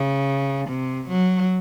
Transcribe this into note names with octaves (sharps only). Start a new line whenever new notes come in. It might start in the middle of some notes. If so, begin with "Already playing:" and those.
Already playing: C#3
C3
F#3